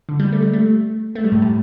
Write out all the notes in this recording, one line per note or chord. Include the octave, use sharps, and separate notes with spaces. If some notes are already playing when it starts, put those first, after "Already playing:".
D3
G3
A3
G3
A3
A3
G3
A2
A2